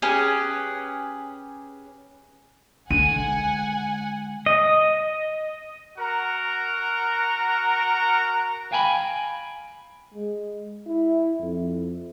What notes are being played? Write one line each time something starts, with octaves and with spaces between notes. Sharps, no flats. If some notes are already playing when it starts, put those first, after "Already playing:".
C#4 G4 G#4 B4
D3 G#3 F#5 G#5 D#7
D#5
F#4 A#4 F#5 A#5
F5 G5 G#5 A#5 B5
G#3
E4
F2